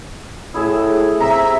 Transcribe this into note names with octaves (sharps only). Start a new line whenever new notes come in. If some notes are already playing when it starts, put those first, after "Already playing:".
A2 E4 G#4 E5
C3 E5 A#5